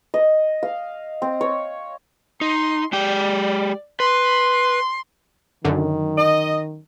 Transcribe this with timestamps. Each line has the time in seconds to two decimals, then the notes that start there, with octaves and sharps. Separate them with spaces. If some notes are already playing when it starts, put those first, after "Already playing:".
0.14 D#5
0.63 F5
1.22 C4
1.41 C#5
2.41 D#4 C6
2.93 G#3 G4 D5 G5
4.00 B4 C6
5.65 F#2 D3 D#3
6.18 D#5